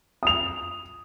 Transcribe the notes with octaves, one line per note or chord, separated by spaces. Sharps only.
D#6 F7